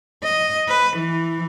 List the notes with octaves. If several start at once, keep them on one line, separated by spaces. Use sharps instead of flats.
D#5
B4
E3